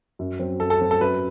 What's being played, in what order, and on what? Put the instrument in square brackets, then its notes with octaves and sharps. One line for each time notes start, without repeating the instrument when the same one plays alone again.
[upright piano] F#2
F#3 C4
[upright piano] F#2 [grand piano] A4
[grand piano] A4
[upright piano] F#3 C4
[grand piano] A4
[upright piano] F#2 [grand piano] B4